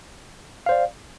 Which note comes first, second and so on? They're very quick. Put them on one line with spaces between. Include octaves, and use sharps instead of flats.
F5 C5 D5